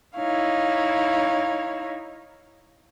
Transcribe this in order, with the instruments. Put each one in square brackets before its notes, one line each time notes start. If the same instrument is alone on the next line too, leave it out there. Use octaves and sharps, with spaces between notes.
[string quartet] D#4 E4 C#5 F5